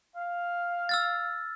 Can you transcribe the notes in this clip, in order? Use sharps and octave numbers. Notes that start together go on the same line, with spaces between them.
F5
E6 F6 A6